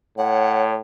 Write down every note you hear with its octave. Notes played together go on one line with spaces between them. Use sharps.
A2 C#5 F#5